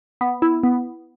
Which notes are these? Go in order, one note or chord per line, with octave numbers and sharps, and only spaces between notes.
B3
E4
B3